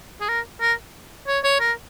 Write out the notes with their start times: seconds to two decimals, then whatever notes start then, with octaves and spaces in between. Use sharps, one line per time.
0.21 G#4
0.28 A#4
0.61 A#4
1.27 C#5
1.44 C#5
1.60 A#4